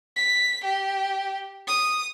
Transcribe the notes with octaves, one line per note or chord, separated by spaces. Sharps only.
B6
G4
D#6